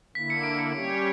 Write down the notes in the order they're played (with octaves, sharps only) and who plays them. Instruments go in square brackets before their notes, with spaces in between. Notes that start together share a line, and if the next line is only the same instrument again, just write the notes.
[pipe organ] D3 A#3 E4 [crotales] B6
[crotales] C#7
D7
C#7
[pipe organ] G3 C#4 G4 C#5